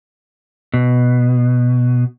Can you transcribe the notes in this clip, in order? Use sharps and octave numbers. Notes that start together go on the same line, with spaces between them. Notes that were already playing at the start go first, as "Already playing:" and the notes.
B2